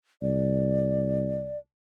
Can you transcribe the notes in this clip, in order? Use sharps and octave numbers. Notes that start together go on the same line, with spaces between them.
C2 D5